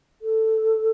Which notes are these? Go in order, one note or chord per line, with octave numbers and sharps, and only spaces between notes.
A4